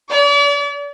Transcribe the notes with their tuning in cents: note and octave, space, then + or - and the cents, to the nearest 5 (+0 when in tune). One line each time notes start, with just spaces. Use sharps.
D5 -45